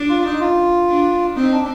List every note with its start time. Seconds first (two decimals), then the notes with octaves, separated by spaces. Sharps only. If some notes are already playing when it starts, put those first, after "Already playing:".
Already playing: D4
0.09 F4
0.26 D#4
0.40 F4
0.88 D4
1.36 C4 D#4
1.52 D4